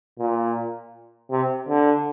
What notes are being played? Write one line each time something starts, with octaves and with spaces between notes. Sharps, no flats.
A#2
C3
D3